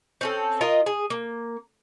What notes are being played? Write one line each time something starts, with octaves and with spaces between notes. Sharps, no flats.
C4 C#4 A4
F4 A#4 D#5
G#4
A#3